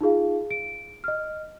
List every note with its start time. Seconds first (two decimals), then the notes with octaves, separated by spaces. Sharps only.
0.01 D#4 F4 G#4 F5
0.51 D7
1.04 D#5 F6